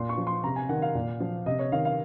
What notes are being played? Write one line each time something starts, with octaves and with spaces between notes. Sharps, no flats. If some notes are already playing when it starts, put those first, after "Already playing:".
Already playing: A#2 C6
C#6
F3
C6
C3 A#5
G#5
D#3 F#5
F5
A#2
F3
C3 D#5
C#5
D#3 F5
F5